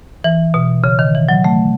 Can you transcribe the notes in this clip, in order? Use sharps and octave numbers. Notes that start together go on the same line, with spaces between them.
E3
B2
C#3
D#3
E3
F#3
A3